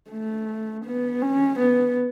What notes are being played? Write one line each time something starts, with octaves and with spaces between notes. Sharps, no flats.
A3
B3
C#4
B3